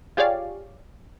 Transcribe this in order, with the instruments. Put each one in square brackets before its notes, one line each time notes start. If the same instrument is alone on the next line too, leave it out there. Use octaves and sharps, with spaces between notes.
[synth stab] F4 G4 G#4 C#5 D5 F5